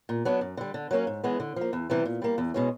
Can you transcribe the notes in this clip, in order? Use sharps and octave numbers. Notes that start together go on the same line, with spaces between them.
A#2
F#3 B3 D4
F#2
D3 G3
D3
F#3 A#3 C#4
G#2
E3 G#3 B3
D3
F3 A#3
E2
C3 E3 G3
A#2
G3 A#3
E2
B2 G#3 C#4